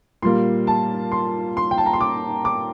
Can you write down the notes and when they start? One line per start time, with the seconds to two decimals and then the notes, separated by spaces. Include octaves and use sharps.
0.22 A#2 G3 A#3 C6
0.67 A5
1.12 C6
1.57 C6
1.71 G5
1.78 A5
1.86 A#5
1.93 C6
2.01 D6
2.45 D6